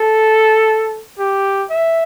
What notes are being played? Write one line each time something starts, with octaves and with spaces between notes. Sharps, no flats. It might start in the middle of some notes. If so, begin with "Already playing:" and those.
Already playing: A4
G4
E5